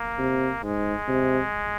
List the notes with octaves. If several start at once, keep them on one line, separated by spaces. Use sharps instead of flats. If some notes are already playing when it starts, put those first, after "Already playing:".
Already playing: A#3
C3
G#2 G#3
C3